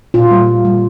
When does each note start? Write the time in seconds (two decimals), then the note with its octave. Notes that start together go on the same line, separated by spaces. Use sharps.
0.14 A#2 F4
0.31 G3 A#3
0.48 A#2
0.65 G3 A#3